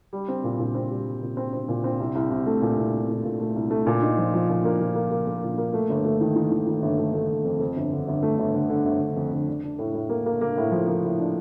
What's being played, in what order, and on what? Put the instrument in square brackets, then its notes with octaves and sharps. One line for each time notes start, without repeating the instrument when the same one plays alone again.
[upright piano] G3
C4
A#2
A#2
C4
G3
G3
A#2
C4
C4
A#2
C4
C2
C2
C2
A3
A#2
C2
C2
A#2
A#2
A3
C2
A3
A#2
D#4
F3
F3
A#2
A#3
F3
A#3
A#3
A#3
A#2
A#3
A3
G1
A3
D#3
D#3
D#3
D#3
G1
A3
A3
G1
F2
F2
G1
D3
G1
A3
G1
D3
D3
G1
G1
F2
D3
D4
D4
A2
A2
A#3
A#3
A#3
A2
F3
A#3
A2
D4